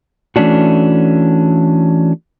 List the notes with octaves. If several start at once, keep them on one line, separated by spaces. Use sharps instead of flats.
E3 A3 C#4 D4 F#4